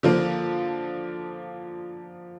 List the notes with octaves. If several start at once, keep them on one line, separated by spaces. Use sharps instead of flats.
D3 F3 A#3